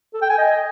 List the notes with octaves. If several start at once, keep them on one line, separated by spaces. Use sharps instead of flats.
A4
G5
G#5
D#5